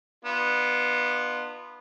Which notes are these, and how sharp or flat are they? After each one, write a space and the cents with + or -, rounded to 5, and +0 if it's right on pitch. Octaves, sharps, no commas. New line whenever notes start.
B3 -10 D4 +45 F4 -10